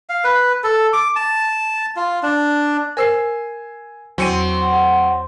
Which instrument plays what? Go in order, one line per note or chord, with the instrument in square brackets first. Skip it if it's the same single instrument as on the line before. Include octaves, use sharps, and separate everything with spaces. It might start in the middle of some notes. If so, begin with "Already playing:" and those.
[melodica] F5
B4
A4
D6
A5
F4
D4
[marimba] A#4 C5 [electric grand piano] G#5 E6 C7
[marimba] E2 [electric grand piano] F#3 C#7 D#7 [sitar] C4
[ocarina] F#5